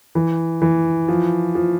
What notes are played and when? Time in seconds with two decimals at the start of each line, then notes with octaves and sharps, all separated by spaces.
0.15 E3
0.62 E3
1.08 F3
1.55 F3